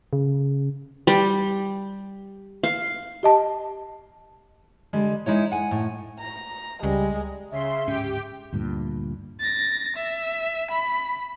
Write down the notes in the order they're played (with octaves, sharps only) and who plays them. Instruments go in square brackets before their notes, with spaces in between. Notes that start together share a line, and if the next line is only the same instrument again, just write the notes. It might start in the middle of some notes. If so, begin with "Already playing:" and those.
[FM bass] C#3
[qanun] G3
F5
[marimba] G4 D#5 A5
[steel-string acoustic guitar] D3 G3 G#3
G#3 D#4 E4 C#5
F#5 G#5
A2
[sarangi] A#5
[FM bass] C#2 [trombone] G3 [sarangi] G#3
[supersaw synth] C#3 C6 [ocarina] E5
[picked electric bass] D1 G#2 C#4 [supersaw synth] G4 G5
[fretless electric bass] D2 G2 A#2
[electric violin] A6 A#6
E5
B5